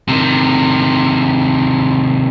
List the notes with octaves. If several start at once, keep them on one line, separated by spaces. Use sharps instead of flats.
C3 D#3